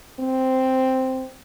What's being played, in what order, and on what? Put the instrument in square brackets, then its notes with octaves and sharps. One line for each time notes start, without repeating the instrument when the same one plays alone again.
[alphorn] C4